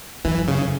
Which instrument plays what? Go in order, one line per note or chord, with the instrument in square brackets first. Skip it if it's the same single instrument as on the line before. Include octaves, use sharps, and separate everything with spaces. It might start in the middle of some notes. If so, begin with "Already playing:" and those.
[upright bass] F#2 [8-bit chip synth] E3
[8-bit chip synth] C#3